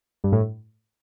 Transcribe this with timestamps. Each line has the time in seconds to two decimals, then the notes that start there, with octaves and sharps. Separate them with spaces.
0.24 G2
0.32 A2